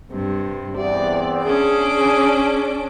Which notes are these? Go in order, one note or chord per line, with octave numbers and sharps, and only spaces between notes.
G2 C3
E2 B3 C4 D5
C#4 D4 G#4 D6